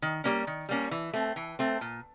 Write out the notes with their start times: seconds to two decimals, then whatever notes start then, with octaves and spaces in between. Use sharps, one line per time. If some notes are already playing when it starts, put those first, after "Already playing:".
0.02 D#3
0.24 G3 A#3 C#4
0.47 D#3
0.69 G3 A#3 C#4
0.91 E3
1.13 A3 C4
1.36 E3
1.59 A3 C4
1.81 A#2